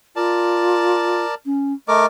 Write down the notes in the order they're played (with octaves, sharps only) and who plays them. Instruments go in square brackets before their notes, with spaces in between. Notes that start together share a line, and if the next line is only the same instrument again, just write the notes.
[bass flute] F4 [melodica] A#4 D5 A5
[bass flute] C#4
[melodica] A3 A#4 D6 [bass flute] D#5